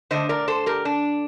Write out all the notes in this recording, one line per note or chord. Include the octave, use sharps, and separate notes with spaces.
D3 A3 D4 C5 D#5
A#4 D5
A4 C5
G4 A#4
D4